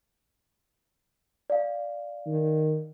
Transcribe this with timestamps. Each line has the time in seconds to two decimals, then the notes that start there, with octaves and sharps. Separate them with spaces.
1.50 D5 F5
2.26 D#3